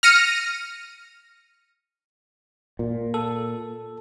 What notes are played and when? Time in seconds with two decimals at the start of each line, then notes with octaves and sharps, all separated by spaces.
0.03 F6 A#6 C#7 D#7
2.79 A#2
3.14 A4